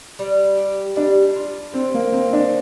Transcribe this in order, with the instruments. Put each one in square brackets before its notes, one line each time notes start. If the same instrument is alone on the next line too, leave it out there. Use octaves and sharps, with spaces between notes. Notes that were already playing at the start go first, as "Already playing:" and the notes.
[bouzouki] G3
G4
[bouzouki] G3 [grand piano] D4
[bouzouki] F4
[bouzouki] D3 [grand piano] C4
[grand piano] A#3
[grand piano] C4 [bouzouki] D#4
[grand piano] D4